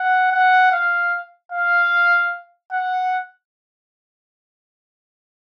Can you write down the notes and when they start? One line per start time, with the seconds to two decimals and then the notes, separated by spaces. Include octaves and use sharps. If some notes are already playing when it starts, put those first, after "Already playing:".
Already playing: F#5
0.32 F#5
0.72 F5
1.52 F5
2.72 F#5